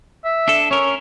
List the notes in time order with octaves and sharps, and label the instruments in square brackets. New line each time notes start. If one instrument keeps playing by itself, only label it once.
[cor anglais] E5
[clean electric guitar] D4 A4
[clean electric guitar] C#4 A#4 [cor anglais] C#5